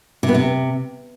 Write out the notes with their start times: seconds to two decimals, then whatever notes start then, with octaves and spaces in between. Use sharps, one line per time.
0.23 C3
0.29 B3
0.35 C3